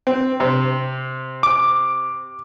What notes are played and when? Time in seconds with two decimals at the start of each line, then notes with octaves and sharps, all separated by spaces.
0.07 C4
0.40 C3 C4
1.43 D6